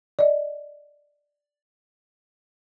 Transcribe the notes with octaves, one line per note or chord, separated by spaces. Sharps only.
D5 D#5